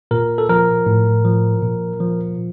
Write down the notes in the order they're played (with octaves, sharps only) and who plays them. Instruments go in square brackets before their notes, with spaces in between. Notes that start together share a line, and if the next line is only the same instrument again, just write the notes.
[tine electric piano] A#2 A#4
A4
F3 A#4
A2
F3
A#2
F3